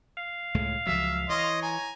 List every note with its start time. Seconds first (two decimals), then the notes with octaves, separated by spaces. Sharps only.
0.17 F5
0.54 C#2 A2 G#3
0.86 C#2 F3 F#3 E5
1.29 E3 C#5 D#5 C6
1.62 G#5 A#5